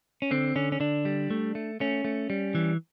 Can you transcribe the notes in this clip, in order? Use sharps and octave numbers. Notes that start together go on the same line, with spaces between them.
C#4
D3 C4
D3 C#4
C#4
D3 D4
G3
A3
A3
A3 C#4
A3
G3
E3